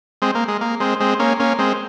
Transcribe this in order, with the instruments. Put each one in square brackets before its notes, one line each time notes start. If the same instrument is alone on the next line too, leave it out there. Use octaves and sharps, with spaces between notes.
[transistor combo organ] G#3 C4
A#3
G#3
A#3
G#3 C4
G#3 C4
A#3 C#4
A#3 C#4
G#3 C4